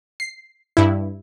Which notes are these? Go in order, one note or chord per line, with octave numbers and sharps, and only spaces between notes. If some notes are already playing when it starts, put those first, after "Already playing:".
C7
G2 E4